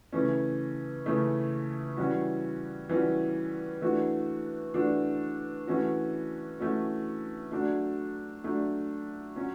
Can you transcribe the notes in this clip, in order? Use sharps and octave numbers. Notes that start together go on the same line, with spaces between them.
C#3 E3 A3 C#4
C#3 E3 A3 C#4
E3 G3 C#4 F#4
E3 G3 C#4 F#4
E3 A3 D4 F#4
E3 A3 D4 F#4
E3 A3 C#4 F#4
E3 A3 C#4 F#4
F#3 A3 D4 F#4
F#3 A3 D4 F#4
F#3 C#4 F#4